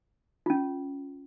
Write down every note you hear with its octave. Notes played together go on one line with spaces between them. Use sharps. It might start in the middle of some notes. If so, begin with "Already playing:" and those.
C#4 F4